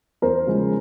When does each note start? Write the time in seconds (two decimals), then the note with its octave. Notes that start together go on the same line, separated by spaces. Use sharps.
0.22 E2 A#4 C5
0.47 C#3 F3 G#3